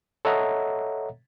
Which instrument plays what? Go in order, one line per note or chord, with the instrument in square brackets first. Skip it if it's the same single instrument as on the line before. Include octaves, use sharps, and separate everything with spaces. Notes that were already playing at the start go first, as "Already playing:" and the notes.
[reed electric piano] A4 C#5 D#5 E5 F#5 A#5